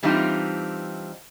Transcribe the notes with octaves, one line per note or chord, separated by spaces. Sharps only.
E3 G3 C4 D4 D#4 F4